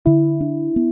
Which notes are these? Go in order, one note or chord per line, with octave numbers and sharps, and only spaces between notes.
D3 E4
D4
B3